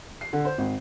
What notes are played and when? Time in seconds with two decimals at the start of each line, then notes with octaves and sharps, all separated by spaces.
0.21 C7
0.33 D3
0.45 C5
0.58 G#1